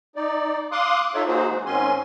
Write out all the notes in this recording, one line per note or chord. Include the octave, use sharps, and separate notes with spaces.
D#4 D5
F5 C6 D6 D#6 F#6
D#4 F4 A4 C#5 E5
A#3 D#4 F#4 G#4 C5
E3 G#3
G#2 D#3 C4 C#4 G#5 C6